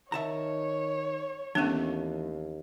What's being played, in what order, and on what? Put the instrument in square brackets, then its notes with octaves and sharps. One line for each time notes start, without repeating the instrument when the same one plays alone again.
[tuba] D#3 [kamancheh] C#5 [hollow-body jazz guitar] E5 A5 A#5
[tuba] D#2 [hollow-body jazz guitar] E3 A3 [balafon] B3 C#4 D4